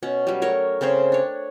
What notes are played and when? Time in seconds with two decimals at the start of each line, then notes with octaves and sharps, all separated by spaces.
0.03 B2 C#4
0.27 F#3 G3
0.42 A3 A#4 C#5
0.81 C#3 C4 C5 C#5
1.12 D4 C#5